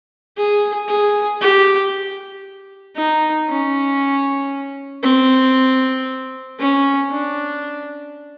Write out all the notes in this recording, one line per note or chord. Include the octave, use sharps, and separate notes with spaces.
G#4
G#4
G4
D#4
C#4
C4
C#4
D4